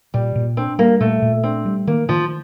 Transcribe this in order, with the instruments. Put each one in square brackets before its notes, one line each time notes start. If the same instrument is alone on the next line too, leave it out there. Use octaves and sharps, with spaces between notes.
[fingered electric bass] A#2 [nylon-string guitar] G3
[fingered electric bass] A#2
[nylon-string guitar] C4 [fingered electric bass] D4
[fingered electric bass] G3 [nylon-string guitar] A#3
[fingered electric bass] A#2 [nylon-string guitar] A3
[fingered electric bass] A#2
[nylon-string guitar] C4 [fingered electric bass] D4
[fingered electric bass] G3
[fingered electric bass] D#3 [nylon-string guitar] A#3
[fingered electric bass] D#3 [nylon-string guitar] F3